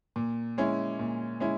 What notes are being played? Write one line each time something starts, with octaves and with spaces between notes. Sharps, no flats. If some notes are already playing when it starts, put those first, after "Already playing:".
A#2
G#3 C#4 E4
A#2
G#3 C#4 E4